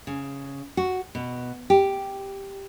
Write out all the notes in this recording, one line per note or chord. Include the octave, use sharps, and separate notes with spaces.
C#3
F#4
B2
G4